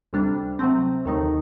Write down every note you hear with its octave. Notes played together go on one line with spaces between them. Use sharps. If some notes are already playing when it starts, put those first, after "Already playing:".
D2 C3 G3 D4
C3 F#3 A3 C4
D#2 D#3 A3 D#4